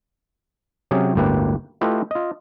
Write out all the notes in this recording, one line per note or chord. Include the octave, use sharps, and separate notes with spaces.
C3 F#3 C#4 G4 G#4
G1 D2 A2 A#3 G4 B4
A3 E4 F4 G4 B4 D#5
F4 D#5